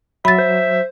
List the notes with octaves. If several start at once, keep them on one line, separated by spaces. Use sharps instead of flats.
F#3 E5 B5 A6
C5